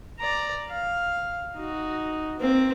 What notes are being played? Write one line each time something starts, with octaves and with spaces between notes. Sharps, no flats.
D5 A#5
F5
D#4 F#4
A#3 C4